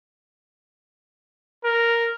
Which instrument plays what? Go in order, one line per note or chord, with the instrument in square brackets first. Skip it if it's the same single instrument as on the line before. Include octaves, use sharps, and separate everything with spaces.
[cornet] A#4